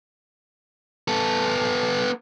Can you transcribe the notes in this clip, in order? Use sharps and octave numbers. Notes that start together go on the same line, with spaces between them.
B3 A4